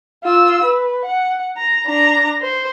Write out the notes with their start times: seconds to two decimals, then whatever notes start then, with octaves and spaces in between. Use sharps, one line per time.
0.24 F4 E6
0.63 B4
1.05 F#5
1.57 A#5
1.87 D4 A#5
2.42 C5